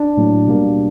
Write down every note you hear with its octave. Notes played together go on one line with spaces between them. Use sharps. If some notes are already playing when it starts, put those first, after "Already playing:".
Already playing: D4
A2 F#3 A#3
B2 G3 A#3